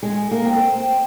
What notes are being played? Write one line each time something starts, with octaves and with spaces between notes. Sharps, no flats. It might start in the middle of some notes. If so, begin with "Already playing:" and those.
G#3
A#3
C4